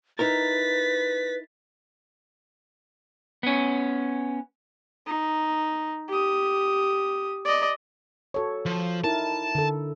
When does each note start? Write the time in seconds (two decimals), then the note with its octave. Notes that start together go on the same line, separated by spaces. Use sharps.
0.19 D#4 E4 A#4 B4 A6 B6
3.43 B3 C#4
5.07 D#4
6.09 G4 D#6
7.45 D5 D#5
8.34 F#4 A4 C#5
8.66 F3
9.04 D#4 E4 A#4 A5
9.55 D3 A4